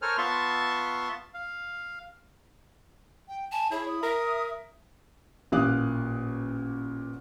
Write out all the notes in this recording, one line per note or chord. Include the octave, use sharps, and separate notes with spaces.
A4 A#4 C5 C#5 G#5 F6
B3 F4 E5 A5 C6 C#6
F5
G5
G#5 A5
E4 G#4 C#5
D#6
A#4 E5
A1 A#2 F5 D6 D#6 F#6